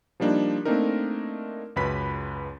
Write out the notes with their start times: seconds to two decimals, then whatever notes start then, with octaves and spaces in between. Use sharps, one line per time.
0.20 F3 G3 A#3 D4 D#4
0.65 A3 A#3 C4 D4 D#4 A#4
1.76 C#2 F#2 B4 B5 B6